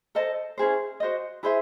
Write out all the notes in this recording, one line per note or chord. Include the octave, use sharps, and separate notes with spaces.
A4 C5 D#5 A5
C#4 E4 G#4 C5
F#4 C5 D#5
E4 G#4 C5 E5